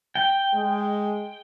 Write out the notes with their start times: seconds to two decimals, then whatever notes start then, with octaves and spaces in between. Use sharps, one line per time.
0.15 G5
0.54 G#3